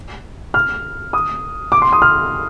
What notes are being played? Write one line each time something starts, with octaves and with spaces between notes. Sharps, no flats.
F6
D#6
D6
C6
D#6
F6